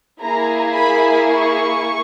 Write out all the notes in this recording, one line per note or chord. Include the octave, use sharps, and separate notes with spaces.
A#3 E4 G#4 A#5
B5
C#6